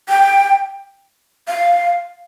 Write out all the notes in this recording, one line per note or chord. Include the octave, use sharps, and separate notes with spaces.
G5
F5